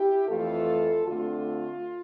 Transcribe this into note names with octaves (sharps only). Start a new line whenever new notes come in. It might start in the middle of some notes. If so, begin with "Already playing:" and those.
Already playing: E4 G4
F2 E3 A3 F4 A4
D3 A3 C4 F4